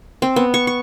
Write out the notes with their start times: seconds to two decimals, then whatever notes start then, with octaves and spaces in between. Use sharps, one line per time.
0.22 C4
0.36 B3
0.54 C#6
0.67 C#6